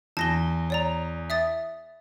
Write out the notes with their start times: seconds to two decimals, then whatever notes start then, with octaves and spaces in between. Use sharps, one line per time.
0.17 E2 A5 A#6 G7
0.70 C#5 D5 A#5
1.30 E5 D#6 A6